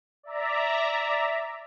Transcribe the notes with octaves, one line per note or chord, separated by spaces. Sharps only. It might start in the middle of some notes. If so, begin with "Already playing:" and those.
D5 E5 A#5